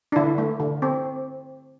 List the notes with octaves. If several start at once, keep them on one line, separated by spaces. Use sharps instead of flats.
D4
D3 E4
A3
D3
C4